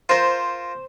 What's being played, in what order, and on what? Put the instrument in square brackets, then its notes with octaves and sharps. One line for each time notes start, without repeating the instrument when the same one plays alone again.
[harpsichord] F4 A#4 [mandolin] C5